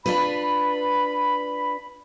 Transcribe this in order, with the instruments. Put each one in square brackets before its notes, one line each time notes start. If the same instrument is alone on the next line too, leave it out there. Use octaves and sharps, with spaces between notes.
[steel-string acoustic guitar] D4 F4 B4 [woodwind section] B5